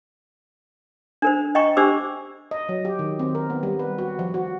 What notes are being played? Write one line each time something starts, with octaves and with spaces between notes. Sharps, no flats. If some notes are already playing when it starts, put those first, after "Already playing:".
D4 A#4 C5
D#5 G5 A#5 C#6
D4 G4 C5 D6 E6
D#5
F#3
G4
D#3
C4
A#4
B3
G3
B4
F#4
F3
F#4